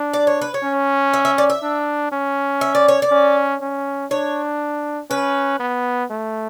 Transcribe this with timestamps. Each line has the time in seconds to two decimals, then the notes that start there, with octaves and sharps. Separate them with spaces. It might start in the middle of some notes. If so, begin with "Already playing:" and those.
Already playing: D4
0.14 D5
0.27 C#5
0.41 B4
0.54 C#5
0.64 C#4
1.14 E5
1.25 E5
1.38 D5
1.50 E5
1.63 D4
2.12 C#4
2.61 E5
2.75 D5
2.88 C#5
3.02 D5
3.11 C#4
3.61 C#4
4.11 D4 C#5
5.10 C#4 B4
5.60 B3
6.10 A3